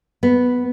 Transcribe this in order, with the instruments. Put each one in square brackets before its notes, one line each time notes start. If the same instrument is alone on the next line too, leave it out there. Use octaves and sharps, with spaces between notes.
[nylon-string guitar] B3